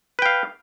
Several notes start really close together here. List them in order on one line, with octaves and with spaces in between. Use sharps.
B4 G5 F5